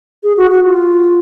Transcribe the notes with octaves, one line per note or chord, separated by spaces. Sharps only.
G#4
F#4
F#4
F4